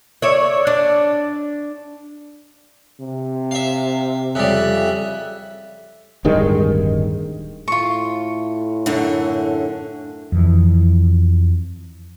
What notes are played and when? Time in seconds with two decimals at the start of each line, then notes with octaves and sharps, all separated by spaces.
0.22 C#5 D5 E5
0.67 D4
3.00 C3
3.51 E5 F5
4.35 F2 C#3 G3 E5 F#6
6.25 D1 G2 D#3 G#3
7.68 A2 F4 C#6
8.86 F#2 D3
10.32 F2 E3